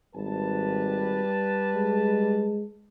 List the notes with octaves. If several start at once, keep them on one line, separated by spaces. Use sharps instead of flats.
G#1 G3 B4 A5
G#3